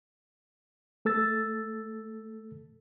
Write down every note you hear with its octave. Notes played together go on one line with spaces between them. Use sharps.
A3 A4 E6 A6